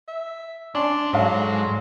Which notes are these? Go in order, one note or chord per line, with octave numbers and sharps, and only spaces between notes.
E5
G#3 C#4 D4 C6
G#2 F#3 A4 F5 F#5